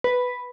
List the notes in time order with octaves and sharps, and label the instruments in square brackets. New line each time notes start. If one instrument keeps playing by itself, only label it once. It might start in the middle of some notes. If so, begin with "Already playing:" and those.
[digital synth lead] B4